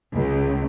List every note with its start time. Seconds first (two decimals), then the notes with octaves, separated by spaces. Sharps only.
0.13 C#2